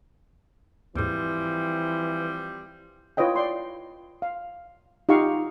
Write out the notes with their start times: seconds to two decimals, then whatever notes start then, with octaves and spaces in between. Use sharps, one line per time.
0.95 D#2 G#2 E3 F3 G3 C4
3.17 E4 F4 B4 C#5 D#5 G5
3.36 D5 G5 C6
4.22 F5
5.09 D#4 F4 G4 F5 F#5 C#6